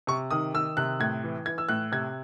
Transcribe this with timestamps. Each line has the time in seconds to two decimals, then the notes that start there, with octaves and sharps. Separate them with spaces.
0.07 C3 C#6
0.31 D#3 D#6
0.54 D#3 E6
0.77 C3 F#6
1.00 A2 G#6
1.24 E3
1.46 E3 G#6
1.58 E6
1.69 A2 F#6
1.92 C3 G#6